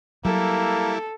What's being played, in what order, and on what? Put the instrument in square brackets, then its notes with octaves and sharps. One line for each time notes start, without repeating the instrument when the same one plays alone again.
[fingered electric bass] F#3 [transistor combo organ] G3 E4 [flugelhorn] A#3 [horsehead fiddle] A4